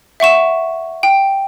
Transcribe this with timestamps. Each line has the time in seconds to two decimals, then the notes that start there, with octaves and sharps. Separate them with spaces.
0.20 E5 F#5 C#6 E7
1.03 G5